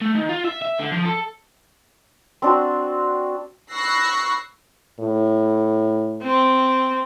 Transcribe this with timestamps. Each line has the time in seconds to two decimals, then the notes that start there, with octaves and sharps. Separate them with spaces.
0.01 A3
0.15 D#3
0.29 F4
0.44 E5
0.62 E5
0.79 D3
0.92 F3
1.05 A4
2.42 C4 D4 F#4
3.71 B5 C#6 E6 F#6 A#6 C7
4.99 A2
6.23 C4